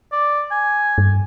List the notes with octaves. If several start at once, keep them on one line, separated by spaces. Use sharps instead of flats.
D5
G#5
G2